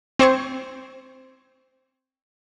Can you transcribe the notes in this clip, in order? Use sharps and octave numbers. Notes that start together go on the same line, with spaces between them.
C4 C5 C#6 G#6